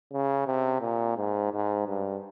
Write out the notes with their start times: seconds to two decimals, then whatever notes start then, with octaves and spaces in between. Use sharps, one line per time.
0.13 C#3
0.46 C3
0.81 A#2
1.17 G#2
1.52 G#2
1.86 G2